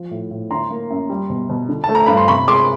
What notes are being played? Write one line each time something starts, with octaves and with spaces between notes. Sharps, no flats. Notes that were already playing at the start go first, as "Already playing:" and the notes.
Already playing: F3
A2
A2
D3 A#5 C6
A#3
F#2
G3
B2
B2
D3
A5
A3
A#5
G2 B5
C6
C3 B5 C#6
G#3 C6 D6